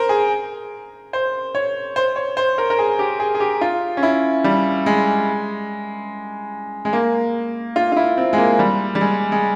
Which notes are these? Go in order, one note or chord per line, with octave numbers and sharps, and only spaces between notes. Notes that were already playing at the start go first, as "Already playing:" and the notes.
Already playing: A#4 C5
G#4
C5
C#5
C5
C#5
C5
A#4
A#4
G#4
G4
G#4
G#4
G4
F4
C#4
E4
G3
G#3
G#3
A#3
F4
F4
E4
C4
G#3
A#3
G3
G3
G#3
G#3